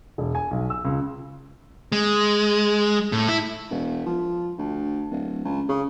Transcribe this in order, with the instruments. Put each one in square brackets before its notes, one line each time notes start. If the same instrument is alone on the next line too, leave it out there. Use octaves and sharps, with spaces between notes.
[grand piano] E1
G#5
B1
E6
C#2
[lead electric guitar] G#3
A2
E4
[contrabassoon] E1
F3
D2
D1
C#2
C#3